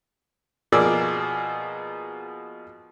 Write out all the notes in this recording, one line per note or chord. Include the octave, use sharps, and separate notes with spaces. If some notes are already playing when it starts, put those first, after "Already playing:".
B2 F3 A#3 G#4 D5 E6